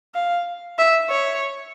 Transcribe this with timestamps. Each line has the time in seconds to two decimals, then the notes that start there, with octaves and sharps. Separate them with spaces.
0.15 F5
0.78 E5
1.10 C#5